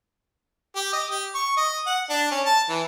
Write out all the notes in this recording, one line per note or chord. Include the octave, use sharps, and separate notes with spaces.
G4
D#5
G4
C#6
D#5
F#5
D4
C#4
A5
E3